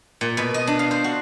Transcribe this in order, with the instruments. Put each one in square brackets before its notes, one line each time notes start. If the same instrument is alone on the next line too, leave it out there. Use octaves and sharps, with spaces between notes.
[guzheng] A#2
B2
D#5
D4
F5
C5
F#4